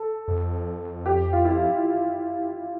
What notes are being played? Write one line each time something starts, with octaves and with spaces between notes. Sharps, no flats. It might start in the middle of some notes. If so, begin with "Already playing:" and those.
Already playing: A4
F2
G4
F4
E4